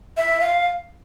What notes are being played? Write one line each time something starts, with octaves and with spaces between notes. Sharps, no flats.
E5
F5